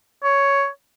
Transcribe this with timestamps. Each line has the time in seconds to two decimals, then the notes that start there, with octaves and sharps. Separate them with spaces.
0.23 C#5